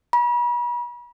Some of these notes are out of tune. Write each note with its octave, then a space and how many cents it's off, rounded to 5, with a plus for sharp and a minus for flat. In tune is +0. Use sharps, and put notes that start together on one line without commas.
B5 -40